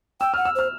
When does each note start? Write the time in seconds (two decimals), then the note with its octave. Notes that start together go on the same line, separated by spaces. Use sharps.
0.20 G5 E6
0.34 F#5 F6
0.45 E6
0.55 C5 F6